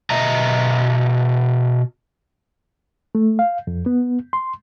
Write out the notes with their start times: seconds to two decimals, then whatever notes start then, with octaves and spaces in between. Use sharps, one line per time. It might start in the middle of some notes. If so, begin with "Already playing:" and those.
0.10 B2 D#5 E5 A#5
3.15 A3
3.39 F5
3.67 F2
3.86 B3
4.33 C6